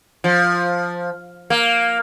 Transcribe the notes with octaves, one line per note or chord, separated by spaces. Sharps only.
F3
A#3